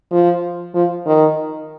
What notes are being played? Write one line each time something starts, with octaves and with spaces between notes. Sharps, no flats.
F3
F3
D#3